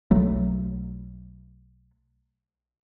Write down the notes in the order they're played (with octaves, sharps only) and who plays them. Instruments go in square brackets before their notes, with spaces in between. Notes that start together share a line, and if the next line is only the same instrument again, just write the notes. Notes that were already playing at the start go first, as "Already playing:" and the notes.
[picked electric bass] B1 F#3 A3